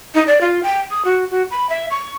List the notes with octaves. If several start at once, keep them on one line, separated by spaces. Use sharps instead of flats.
D#4
D5
F4
G5
D#6
F#4
F#4
B5
E5
C#6